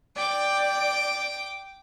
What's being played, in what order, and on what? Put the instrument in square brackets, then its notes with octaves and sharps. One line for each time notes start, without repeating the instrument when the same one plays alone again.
[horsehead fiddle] D5 [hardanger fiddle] G5 D6